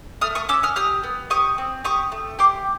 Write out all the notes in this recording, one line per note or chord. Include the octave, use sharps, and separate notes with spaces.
A3 D#6 F6
C#6 D#6
C#4 D6 E6
D#6 F6
G4 D#6 F6
B3
G4 C#6 D#6
C4
G4 C#6 D#6
A3
G4 C6 D6